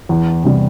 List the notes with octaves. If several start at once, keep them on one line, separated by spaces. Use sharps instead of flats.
E2
C3 G3